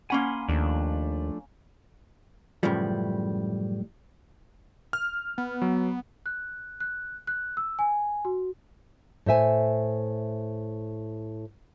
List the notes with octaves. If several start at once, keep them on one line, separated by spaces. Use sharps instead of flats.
A#3 C#4 F#5 G#5 B5 C6
D#2 F3 A3 D4
F#2 A2 C#3 E3 F3 G3
F6
B3
F#3
F#6
F#6
F#6
E6
G#5
F#4
A2 C5 E5 G#5